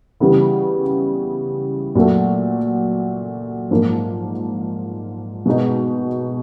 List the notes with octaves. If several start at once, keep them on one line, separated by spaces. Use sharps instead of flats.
C#3 E3 G3 B3
A#2 F#3 A3
G#2 F3 A#3
B2 G#3 B3 D#4